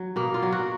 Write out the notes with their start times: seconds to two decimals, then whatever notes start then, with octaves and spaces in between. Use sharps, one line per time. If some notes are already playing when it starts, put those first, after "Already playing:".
Already playing: F#3
0.16 B2 A#3
0.34 F4
0.43 F#3
0.52 F#4